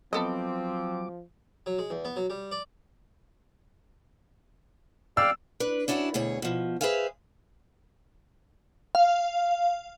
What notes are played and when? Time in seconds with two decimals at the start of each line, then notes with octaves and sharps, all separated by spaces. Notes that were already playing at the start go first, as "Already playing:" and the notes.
0.13 F3 F#3 B3 C4 A4 D#5 D6
1.66 F#3
1.79 G#3
1.90 E2
2.05 B3
2.16 F#3
2.30 G3
2.51 D5
5.17 D5 F5 G5 E6
5.60 D4 B4
5.88 C#4 D4 E4 F#4 A#4 C#5
6.14 D2 B2 G#4 C#5
6.42 B2 F3
6.81 G#4 B4 C5 E5 F5 G#5
8.95 F5